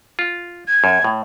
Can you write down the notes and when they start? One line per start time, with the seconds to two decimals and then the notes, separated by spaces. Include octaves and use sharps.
0.19 F4
0.68 G#6
0.84 F#2
1.04 A2